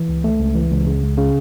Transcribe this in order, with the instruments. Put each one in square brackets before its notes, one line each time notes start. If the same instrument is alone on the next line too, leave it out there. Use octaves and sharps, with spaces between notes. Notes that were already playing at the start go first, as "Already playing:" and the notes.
Already playing: [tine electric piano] E3
C#2
A3
C#2
E3
C#2
C#3
C#2
C#3